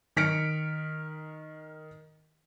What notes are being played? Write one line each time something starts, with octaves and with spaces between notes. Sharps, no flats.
D#3 F6 B6 C#7 D7